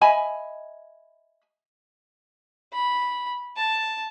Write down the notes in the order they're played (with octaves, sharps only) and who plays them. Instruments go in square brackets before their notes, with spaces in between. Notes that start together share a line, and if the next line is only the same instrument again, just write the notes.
[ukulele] D#5 E5 G#5 B5
[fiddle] B5
A5